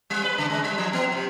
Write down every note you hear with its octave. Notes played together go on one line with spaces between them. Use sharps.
G3
B4
C#3
G#3
G3
F3
B3
C3